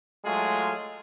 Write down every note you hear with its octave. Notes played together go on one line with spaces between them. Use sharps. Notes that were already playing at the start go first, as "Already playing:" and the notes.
F#3 G#3 A3 F4 G#4